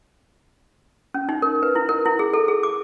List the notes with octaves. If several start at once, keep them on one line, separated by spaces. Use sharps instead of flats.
C#4
D#4
A#4
B4
E4
A#4
E4
G#4
A4
G#4
D6